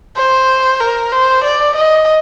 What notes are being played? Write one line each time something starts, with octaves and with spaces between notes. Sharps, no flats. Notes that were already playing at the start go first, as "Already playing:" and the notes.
C5
A#4
C5
D5
D#5